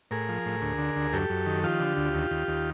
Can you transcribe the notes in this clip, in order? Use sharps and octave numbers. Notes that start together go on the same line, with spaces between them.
A2 G#4 A#4
F3
A2
D2
D3
D2
F#2 G4 A4
F#2
D#3
F3 F4 G4
D3
D2
D#2
D#2
D#2